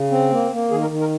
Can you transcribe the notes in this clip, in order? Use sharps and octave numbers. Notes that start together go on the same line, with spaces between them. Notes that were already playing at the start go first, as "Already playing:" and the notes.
Already playing: C#3
C4
A#3
A#3
D#3 G#4
A#4
D#3
A#4